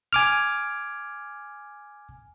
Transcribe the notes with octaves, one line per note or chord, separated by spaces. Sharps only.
G#5 D6 F6